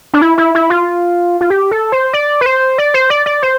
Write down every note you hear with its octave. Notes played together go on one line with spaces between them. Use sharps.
D4
E4
E4
E4
F4
F4
G4
A4
C5
D5
B4
C5
D5
C5
D5
D5
C5